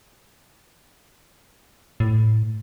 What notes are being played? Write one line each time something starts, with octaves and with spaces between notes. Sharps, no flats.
A2